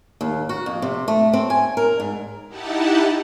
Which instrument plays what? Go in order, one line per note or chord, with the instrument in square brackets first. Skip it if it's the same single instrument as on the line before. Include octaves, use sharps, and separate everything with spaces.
[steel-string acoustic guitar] D#2
F#4
F2
C3
A3
C4
G#5
A#4
G#2
[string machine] D#4 E4 G4 F#5 A5